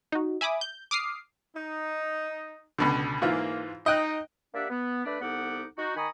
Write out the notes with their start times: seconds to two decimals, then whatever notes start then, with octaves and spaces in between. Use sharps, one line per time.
0.12 D#4 F#4
0.41 E5 G#5 B5 D6 D#6
0.61 G6
0.91 D6 D#6 F6 C7
1.55 D#4
2.78 C#2 B2 D3
3.22 G#2 E3 A#3 F4
3.86 D#4 D#5 G5 F#6
4.54 A#3 D4 G4 D5 E5 F#5
4.70 B3
5.05 A3 D4 B4 D5
5.21 C2 B3 D#4 A4 F#5 D6
5.78 D#4 F#4
5.96 D#3 G#5 A#5 B5 C#6 D#6